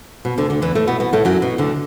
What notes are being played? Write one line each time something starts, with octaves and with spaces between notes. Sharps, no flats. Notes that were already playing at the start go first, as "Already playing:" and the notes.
B2
D2 D3
D2 D3
E2 E3
A2 A3
B2 B3
B2 B3
A2 A3
F#2 F#3
B2
D2 D3